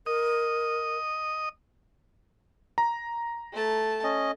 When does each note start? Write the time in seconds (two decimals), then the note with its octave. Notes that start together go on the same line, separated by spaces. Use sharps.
0.06 A#4 D#5 D#6
2.78 A#5
3.53 A3 A5
4.04 C#4 D#5